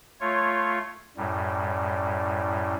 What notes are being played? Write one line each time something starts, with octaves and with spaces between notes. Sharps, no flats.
A3 F4 C#5
F#2 A2 G3